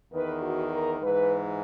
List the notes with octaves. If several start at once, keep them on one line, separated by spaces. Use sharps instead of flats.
E2 D#3 B4
F#4
A#4
G#2 E3 B4